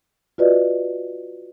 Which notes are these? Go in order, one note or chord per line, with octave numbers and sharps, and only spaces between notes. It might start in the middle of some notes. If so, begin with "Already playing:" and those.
F4 F#4 B4 D5 D#5